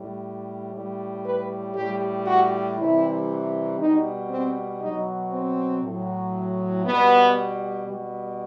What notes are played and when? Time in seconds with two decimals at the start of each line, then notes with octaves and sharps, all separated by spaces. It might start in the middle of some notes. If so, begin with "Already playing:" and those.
Already playing: A2 G3
0.73 A2 G3
1.24 B4
1.74 A2 G3 G4
2.26 F#4
2.76 C3 E3 G3 E4
3.79 B2 G3 D#4
4.29 C4
4.80 B2 F#3 D#4
5.31 C4
5.82 A2 F#3
6.84 B2 G3 B3
7.86 B2 G3